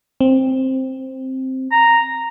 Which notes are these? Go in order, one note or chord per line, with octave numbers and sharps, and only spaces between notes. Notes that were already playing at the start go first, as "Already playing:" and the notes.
C4
A#5